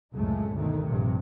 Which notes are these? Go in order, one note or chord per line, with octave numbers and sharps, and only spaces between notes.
C#2 F#2 A2 C3 G#3 A3
G1 D2 B2 D3 D#3 A3
A#1 G2 C3